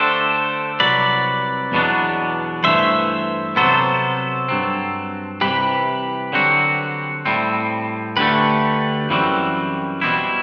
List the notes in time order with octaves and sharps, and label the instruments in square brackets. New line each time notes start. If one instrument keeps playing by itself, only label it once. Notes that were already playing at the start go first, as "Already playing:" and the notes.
Already playing: [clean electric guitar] D3 A3 D4 G4 [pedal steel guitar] A4 C5
[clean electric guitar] C2 C3 F#3 [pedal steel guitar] B4 D5
[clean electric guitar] E2 B2 F#3 B3 D4
[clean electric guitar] G2 E3 A3 [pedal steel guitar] C5 E5
[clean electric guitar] C3 F#3 B3 [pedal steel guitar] A4 C5
[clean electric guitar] G2 F#3 C4
[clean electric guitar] C2 C3 E3 [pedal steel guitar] G4 B4
[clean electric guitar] D3 F#3 C4 F#4
A2 G3 C4
[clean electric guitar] D2 D3 A3 [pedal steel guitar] G4 B4
[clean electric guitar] F#2 E3 G3 C4 F#4
B2 G3 C4 E4